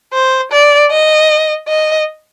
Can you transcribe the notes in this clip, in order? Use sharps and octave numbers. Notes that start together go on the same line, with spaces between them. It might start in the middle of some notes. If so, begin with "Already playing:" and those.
C5
D5
D#5
D#5